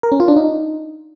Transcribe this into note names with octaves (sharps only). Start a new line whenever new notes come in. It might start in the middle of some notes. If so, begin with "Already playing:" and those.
A#4
C#4
F4
D4
D#4